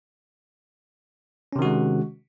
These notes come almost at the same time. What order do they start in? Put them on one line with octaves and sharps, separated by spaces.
C#4 C3 D#3 F#4 G#3